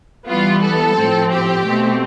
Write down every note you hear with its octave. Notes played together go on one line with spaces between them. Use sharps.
E3 G3 B3 F4
A4
A2 F3 C4
G4
B2 A3 C4